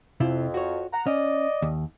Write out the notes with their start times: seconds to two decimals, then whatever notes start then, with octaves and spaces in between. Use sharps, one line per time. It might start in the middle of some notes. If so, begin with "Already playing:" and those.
0.20 F2 C3 E4 F4
0.54 F#4 C#5
0.93 F#5 A#5
1.07 C#4 D5 D#5
1.62 D#2